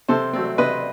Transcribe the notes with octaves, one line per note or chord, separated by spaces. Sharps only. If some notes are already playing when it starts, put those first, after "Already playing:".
C3 A4 C5
F#3 A3 C4
C3 B4 D#5